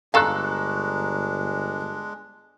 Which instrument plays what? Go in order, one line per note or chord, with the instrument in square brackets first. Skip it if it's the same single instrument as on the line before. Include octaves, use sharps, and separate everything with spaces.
[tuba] G1 [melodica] G#3 D4 [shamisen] A4 F5 [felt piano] A#5 C#6 F#6